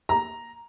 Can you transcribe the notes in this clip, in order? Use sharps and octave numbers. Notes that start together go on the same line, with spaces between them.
A#5